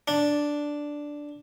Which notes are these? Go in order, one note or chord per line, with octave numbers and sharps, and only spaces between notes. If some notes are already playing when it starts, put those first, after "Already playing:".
D4